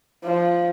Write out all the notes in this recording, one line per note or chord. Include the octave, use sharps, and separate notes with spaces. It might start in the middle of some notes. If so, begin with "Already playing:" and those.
F3